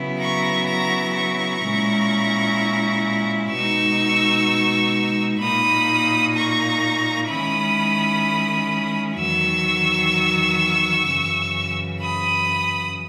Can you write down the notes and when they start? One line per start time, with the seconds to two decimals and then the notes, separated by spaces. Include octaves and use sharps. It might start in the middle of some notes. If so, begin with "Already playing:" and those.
Already playing: C#3 F#3 B3 E4
0.20 A#5 C#6
0.67 A#5 C#6
1.15 A#5 C#6
1.62 A#2 G#3 C#4 E4
3.51 B2 G#3 D#4 C#6 E6
5.40 A#2 A#3 D#4 B5 D#6
6.35 A#5 C#6
7.29 D#3 G#3 C#4 E4 B5 D#6
9.18 E2 D#3 F#3 C#6 E6
11.07 F#2 C#3 E3
12.02 B5 D#6